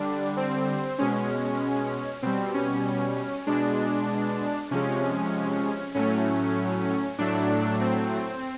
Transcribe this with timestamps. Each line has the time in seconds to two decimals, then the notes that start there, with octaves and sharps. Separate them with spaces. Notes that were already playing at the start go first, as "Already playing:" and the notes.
Already playing: D3 G3 D4
0.37 C4
0.99 B2 G#3 C#4
2.22 B2 G3 C4
2.54 C#4
3.46 B2 G#3 D4
4.71 C3 F3 G#3 C#4
5.95 A2 F#3 A3 C#4
7.18 A2 F#3 A3 D4
7.81 C4